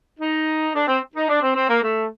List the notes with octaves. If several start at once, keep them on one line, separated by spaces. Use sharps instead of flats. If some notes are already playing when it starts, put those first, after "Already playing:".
D#4
D4
C4
D#4
D4
C4
C4
A#3
A3